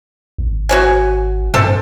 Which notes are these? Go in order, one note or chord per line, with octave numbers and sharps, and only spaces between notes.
G#1
F#4 C#5 G#5
G2 C4 A4